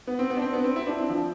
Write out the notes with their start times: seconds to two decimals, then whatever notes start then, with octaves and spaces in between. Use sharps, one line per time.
0.07 B3
0.19 C4
0.30 B3
0.37 D4
0.42 C4
0.53 B3
0.64 C4
0.76 E4
0.87 D4
0.99 C4
1.09 F3